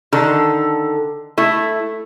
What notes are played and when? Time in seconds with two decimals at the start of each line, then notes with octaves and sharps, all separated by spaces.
0.12 D3 D#3 A4
1.38 A3 E4